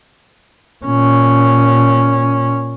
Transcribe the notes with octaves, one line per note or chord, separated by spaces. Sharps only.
A#2 C#4